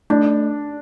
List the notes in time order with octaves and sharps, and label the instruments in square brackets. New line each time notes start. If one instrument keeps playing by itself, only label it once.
[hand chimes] A3 [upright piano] D4